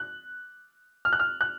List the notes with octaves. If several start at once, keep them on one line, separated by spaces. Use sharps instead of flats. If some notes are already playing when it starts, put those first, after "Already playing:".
Already playing: F#6
F6
F#6
F6
F#6